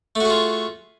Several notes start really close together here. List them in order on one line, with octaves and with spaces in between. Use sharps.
A3 F#4 G#4 F4